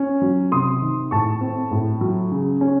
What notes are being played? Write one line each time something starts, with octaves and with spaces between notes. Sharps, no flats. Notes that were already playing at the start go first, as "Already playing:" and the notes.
Already playing: C#4
F#3
C3 C6 D#6
D#3
A2 A5 C#6
C4
A2
F#3
C#3
C#4